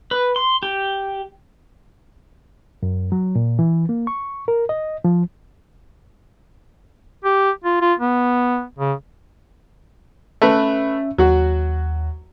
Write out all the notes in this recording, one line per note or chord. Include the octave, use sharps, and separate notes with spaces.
B4
C6
G4
F#2
F#3
A#2
E3
A#3
C#6
A#4
D#5
F3
G4
F4
F4
B3
C#3
A3 C#4 B4 E5
D#2 F#3 F#4